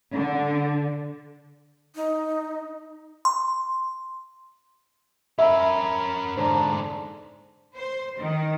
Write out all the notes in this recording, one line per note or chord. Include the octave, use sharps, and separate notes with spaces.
D3
D#4
C6
C#4 A#4 E5 B5
G#2 D3 D4 C5 A#5
C5
D#3